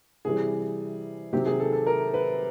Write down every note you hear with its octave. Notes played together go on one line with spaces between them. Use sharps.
C3 E3 G3 G#4
C3 D#3 F#3 G4
G#4
A4
A4
A#4
B4